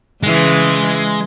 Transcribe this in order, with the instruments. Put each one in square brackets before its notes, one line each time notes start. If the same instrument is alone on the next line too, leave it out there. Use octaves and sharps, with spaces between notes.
[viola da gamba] C#3 E3 [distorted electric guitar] G#3